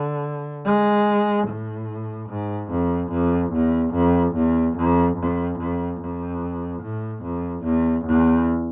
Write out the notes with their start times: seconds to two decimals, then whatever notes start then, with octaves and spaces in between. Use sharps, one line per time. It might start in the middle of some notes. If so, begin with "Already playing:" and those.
Already playing: D3
0.65 G#3
1.47 A2
2.29 G#2
2.70 F2
3.11 F2
3.52 E2
3.93 F2
4.35 E2
4.76 F2
5.17 F2
5.59 F2
6.00 F2
6.82 A2
7.23 F2
7.64 E2
8.05 E2